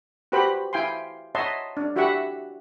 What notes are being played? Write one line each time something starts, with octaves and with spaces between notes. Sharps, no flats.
F#4 G4 B4 C5 F#5 B5
E4 F5 G5 G#5 C6
C#5 D#5 E5 F#5 A5 C6
D4
E4 F#4 G4 E5 F#5 C#6